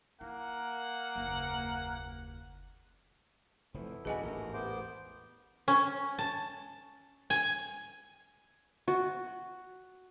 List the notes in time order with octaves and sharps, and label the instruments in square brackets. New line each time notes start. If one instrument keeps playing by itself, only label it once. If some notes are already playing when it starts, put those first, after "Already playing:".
[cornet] A#3 [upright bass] E4 [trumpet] F#5
[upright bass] F#1 D#2
[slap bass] F1 F3 [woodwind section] A3 B3 E4
[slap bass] D#1 A#1 [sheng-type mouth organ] D4 F#4 B4 [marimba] G#4 D#5 G#5
[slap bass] A1 E2 G#2 [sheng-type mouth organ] A#4
[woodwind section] C2 [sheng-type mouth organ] B3 C5 D6
[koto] C#4
A5
G#5
[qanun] F#4